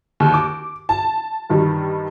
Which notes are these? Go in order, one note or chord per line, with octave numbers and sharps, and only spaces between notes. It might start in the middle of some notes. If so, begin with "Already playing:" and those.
D#2
D6
A5
G2 D#3 G3